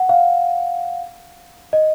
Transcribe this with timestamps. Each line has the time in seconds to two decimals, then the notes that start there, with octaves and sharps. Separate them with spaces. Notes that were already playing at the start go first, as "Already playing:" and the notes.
Already playing: F#5
0.09 F5
1.73 D#5